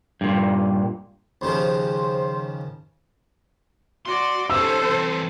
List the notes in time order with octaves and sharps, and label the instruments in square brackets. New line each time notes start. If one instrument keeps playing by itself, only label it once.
[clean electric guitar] G2 A#2
[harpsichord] D#2 C#3 F3 [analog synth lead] C5
[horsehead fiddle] F#4 D5 [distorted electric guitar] C6
[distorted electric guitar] D#3 C#4 [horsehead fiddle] A4 C5 [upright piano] E6
[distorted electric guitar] E3 C4